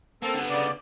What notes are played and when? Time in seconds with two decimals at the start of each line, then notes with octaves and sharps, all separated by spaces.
0.22 A#3 C4 A4
0.34 D3 B3
0.50 C#3 D5